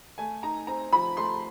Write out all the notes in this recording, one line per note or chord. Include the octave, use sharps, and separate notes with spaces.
A3 G#5
D#4 A#5
C4 A#5
F3 B5
A3 C6